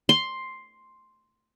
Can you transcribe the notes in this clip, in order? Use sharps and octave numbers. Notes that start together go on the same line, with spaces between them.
C6